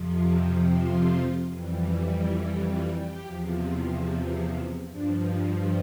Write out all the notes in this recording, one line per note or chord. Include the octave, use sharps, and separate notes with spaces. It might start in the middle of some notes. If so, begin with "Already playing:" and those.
Already playing: F2 C3 F3
F4
F2 E3 G3
E4
F4
G4
E2 C3 F3
G2 F3 D4